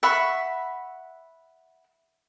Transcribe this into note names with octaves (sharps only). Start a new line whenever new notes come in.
E5 F#5 B5 C#6